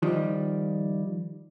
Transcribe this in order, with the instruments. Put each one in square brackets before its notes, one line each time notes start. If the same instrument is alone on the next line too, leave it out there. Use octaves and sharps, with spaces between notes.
[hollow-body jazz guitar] D#3 F3 G3